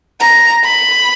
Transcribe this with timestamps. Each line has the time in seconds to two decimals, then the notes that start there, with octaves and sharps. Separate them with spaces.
0.20 A#5
0.65 B5